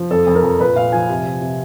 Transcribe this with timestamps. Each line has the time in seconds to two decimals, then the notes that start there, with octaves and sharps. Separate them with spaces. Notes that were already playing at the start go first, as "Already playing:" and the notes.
Already playing: F3
0.11 F2 A4
0.27 F2
0.35 A#4
0.43 F2
0.60 A#2 B4
0.76 A#2 F5
0.92 F3 G#5
1.09 C3
1.26 C3
1.41 C3